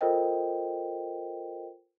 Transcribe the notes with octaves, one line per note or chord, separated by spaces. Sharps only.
F4 A4 A#4 C5 D#5 G5